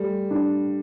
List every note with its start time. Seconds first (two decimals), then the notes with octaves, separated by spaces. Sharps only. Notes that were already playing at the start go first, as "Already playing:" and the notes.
Already playing: G3 A3
0.31 D4